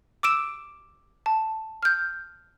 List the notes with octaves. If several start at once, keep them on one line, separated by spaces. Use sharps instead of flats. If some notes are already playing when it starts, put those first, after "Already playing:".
D6 E6 D7 E7
A5
F6 G6